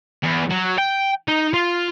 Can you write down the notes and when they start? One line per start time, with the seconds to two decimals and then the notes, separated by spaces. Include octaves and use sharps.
0.23 E2
0.50 F#3
0.78 G5
1.28 D#4
1.54 F4